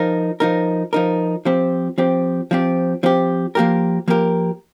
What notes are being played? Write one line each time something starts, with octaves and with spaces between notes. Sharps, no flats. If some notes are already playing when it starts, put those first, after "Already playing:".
Already playing: F3 D#4 A#4
F3 D#4 A#4
F3 D#4 A#4
F3 C4 G4
F3 C4 G4
F3 C4 G4
F3 C4 G4
F3 A#3 G4 A#4
F3 A#3 G4 A#4